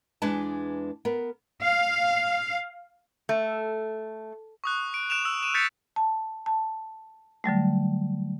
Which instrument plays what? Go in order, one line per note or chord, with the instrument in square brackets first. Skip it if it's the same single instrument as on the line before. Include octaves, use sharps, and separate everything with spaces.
[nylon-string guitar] E2 G#3 D4 B4 A5
B3 A#4
[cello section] F5
[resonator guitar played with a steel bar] A3
[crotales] C#6 D#6 F#6
D7
F#6 D7 E7 F7
E6
D#7 E7
F#6 G6 A6 B6 C#7
[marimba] A5
A5
D3 F#3 G3 A3